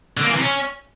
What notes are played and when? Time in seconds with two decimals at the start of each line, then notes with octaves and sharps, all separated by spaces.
0.17 D3
0.23 A#3
0.29 E3
0.36 C3
0.42 C#4